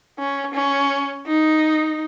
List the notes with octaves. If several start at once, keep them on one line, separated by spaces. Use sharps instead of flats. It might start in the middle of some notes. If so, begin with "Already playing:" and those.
C#4
C#4
D#4